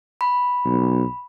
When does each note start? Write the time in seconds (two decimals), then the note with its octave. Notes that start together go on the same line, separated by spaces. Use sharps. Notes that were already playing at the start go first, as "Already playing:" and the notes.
0.21 B5
0.65 B1